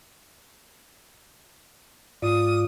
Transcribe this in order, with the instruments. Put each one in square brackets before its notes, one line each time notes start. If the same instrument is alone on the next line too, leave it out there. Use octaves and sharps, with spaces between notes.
[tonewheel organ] G#2 F4 D5 [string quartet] D#6